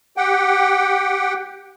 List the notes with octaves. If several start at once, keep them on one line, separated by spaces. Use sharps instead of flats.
G4 F#5 G5